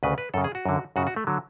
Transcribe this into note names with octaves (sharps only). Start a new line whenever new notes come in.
D2 C#3 B4
B4
F#2 C#3 A4
G#4
F#4
F#2 D3
F#2 C#3 F#4
F#4
A3
D3 F#3